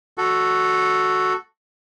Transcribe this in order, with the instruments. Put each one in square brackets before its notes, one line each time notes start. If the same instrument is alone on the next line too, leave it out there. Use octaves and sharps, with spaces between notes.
[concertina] F#4 A4